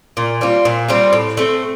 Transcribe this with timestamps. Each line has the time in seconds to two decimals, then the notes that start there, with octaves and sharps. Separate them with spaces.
0.17 A#2
0.41 G3 C4 F4
0.65 A#2
0.88 G3 C4 F4
1.13 A2
1.37 A3 C4